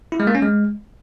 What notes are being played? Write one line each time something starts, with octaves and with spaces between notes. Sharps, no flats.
E4
G#3
A#3
C#4
G#3